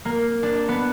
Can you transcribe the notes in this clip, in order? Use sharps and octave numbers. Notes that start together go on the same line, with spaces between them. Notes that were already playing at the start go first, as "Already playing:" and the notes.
A#3
D4
B3